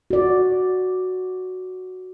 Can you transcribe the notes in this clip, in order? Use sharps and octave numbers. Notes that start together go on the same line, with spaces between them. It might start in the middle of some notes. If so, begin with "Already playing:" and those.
F#4 D5